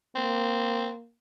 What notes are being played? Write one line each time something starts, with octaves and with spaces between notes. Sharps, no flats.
A#3 C4